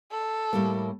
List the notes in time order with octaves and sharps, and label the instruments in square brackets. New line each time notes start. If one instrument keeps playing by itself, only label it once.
[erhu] A4
[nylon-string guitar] A2 G3 A#3